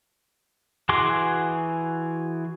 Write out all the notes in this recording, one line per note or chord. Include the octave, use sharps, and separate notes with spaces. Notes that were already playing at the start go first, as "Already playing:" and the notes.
E3 F#4 G#4 C6 D6